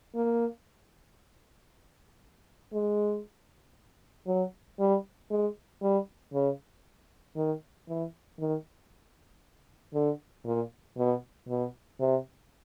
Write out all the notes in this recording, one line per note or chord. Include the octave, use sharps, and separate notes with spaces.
A#3
G#3
F#3
G3
G#3
G3
C#3
D#3
E3
D#3
D3
A#2
B2
B2
C3